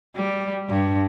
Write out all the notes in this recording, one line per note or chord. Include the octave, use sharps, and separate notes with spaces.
G3
G2